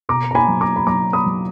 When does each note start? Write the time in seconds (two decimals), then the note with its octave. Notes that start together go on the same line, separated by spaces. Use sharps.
0.09 B2 A#5 D6
0.31 A#5
0.35 G#5 B5
0.48 F#3
0.61 A#5 D6
0.76 B5
0.87 F#3 A#5 D6
1.13 B5 D#6
1.26 F#3